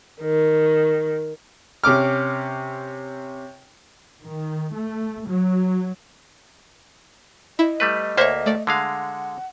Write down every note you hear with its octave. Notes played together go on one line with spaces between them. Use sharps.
D#3
C3 C#4 D6 F6
D#3
A3
F#3
E4 D#5
G3 A3 B4
D2 A#3 C5 C#5 E5
A3 D5
D3 G#3 F5 F#5